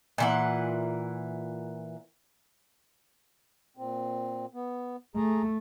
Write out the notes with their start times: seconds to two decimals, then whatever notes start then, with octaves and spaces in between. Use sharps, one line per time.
0.18 A#2 E3 F#5
3.77 A#2 C4
4.54 B3
5.15 A3 G#4 A#5